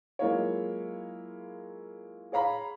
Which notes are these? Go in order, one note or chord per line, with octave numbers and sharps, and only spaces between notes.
F#3 G#3 A#3 E4 F4 C#5
G#4 C#5 F5 A#5 B5